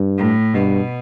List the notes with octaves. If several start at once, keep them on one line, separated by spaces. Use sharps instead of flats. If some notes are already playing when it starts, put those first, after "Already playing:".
Already playing: G2
A2
G2 B2